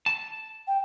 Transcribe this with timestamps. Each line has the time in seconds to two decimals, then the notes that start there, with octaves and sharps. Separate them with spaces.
0.06 A5
0.67 G5